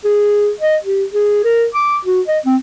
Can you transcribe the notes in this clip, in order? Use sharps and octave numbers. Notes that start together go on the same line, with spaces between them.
G#4
D#5
G4
G#4
A#4
D6
F#4
D#5
C4